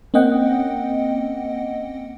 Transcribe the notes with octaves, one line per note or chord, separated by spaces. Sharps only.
A#3 C4 C#4 D#5 F#5 G5